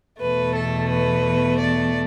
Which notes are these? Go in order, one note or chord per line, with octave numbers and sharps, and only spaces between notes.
E2 B2 A3 B4
A4
B4
D5